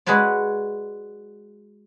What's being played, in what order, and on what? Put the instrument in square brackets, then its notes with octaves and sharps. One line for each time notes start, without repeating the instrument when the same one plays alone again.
[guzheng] G#3 F#4 B4 C#5 D5